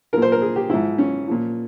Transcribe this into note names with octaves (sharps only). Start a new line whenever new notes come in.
A#2 F3 A#4
C5
A#4
G#4
G4
G#2 F3 E4
C#4
A#2 F3